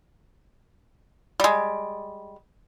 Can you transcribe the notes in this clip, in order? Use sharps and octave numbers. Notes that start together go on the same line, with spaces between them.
G3 G#3